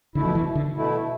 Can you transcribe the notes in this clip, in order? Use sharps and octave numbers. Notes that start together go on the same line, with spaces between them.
B2 D3 A3 E4
F3
E3
D3
B2 A3 E4